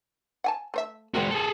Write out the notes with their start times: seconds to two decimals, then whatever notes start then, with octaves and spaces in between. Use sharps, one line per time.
0.44 F#5 G#5 A5
0.74 A3 C5 E5
1.15 G#3 B3 C4 F#4 A#4
1.31 G#4 A4